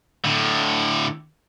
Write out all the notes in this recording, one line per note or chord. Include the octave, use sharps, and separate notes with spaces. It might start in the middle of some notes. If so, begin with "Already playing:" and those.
A2 D3